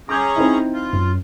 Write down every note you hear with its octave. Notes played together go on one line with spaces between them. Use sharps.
C#4 G#4 A#5 D6 G6 G#6
C4 D#4 E4
F4
F#2